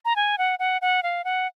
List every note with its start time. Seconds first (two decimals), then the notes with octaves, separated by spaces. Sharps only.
0.05 A#5
0.16 G#5
0.38 F#5
0.59 F#5
0.82 F#5
1.03 F5
1.24 F#5